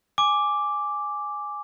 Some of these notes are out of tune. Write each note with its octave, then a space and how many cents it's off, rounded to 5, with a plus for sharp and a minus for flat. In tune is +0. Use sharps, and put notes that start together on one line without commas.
G#5 +0 D6 +0